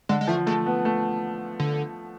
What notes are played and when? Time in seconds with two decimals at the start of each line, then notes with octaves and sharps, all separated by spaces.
0.09 D3 G#3
0.21 G#3
0.27 F3 A3
0.46 G#3 A3
0.66 B3
0.85 A3
1.60 D3